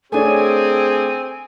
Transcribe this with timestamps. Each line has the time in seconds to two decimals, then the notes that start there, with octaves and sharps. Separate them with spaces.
0.12 A3 C4 D4 G#4 C#5 G#5